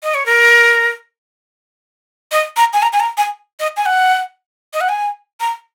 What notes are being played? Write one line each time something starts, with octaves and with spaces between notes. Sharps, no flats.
D#5
C#5
A#4
D#5
A#5
G#5
A#5
G#5
A#5
G#5
D#5
G#5
F#5
D#5
F#5
G#5
A#5